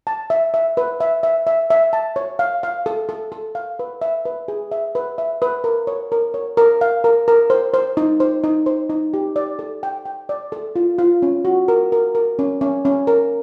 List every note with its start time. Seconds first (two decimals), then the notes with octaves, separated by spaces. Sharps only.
0.07 A5
0.30 E5
0.54 E5
0.77 B4
1.00 E5
1.23 E5
1.47 E5
1.70 E5
1.93 A5
2.16 C#5
2.39 F5
2.63 F5
2.86 A4
3.09 A4
3.32 A4
3.55 F5
3.79 B4
4.02 E5
4.25 B4
4.48 G#4
4.72 E5
4.95 B4
5.18 E5
5.42 B4
5.64 A#4
5.87 C#5
6.12 A#4
6.34 C#5
6.57 A#4
6.81 F5
7.04 A#4
7.28 A#4
7.50 C5
7.74 C5
7.97 D#4
8.20 C5
8.44 D#4
8.66 C5
8.90 D#4
9.14 G4
9.36 D5
9.59 A4
9.83 G5
10.05 G5
10.29 D5
10.52 A4
10.76 F4
10.99 F4
11.22 C#4
11.45 F#4
11.68 A#4
11.92 A#4
12.15 A#4
12.39 C#4
12.61 C#4
12.85 C#4
13.07 A#4